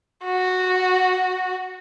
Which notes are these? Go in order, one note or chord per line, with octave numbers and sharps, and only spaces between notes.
F#4